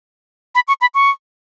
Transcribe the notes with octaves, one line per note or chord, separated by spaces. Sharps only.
B5
C#6
B5
C#6